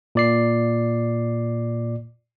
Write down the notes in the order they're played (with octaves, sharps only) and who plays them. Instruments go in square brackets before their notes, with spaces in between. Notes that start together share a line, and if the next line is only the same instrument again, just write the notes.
[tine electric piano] A#2 D5 C7